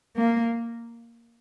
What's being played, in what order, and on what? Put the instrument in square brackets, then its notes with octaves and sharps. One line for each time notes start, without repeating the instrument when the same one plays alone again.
[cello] A#3